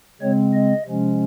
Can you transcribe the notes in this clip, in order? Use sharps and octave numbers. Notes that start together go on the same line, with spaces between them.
C#3 G#3 C4 C#5
D#5
C3 F3 G#3 C#4